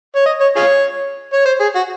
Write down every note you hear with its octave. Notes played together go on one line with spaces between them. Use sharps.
C#5
D#5
C#5
F4 G#4 C#5
C#5
C5
G#4
F#4